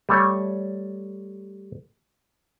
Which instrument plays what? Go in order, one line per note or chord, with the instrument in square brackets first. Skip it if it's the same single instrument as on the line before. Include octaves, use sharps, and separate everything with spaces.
[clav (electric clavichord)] G3 A3 C#5